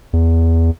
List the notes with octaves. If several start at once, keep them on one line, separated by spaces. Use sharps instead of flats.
E2